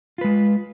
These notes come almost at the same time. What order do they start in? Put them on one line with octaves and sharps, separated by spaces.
F4 B4 G#3